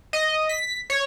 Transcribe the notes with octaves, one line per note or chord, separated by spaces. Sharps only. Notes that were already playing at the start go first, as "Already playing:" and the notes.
D#5
B6
C#5